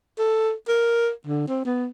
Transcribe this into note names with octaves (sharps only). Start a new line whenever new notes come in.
A4
A#4
D3
C4
B3